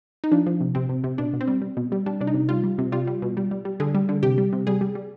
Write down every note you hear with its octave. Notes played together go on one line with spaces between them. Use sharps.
D#4
F3 D4
F3
C3
C3 C4
C3
C3
B2 D4
B2
C4
G3
G3
B2
G3
G3 D4
C3 D4
D#4
C3
G3 F4
G3
C3
G3 F4
G3
B2
G3
G3
G3
D3 G#4
G3
D3
C3 G4
G3
C3
G3 G#4
G3
G3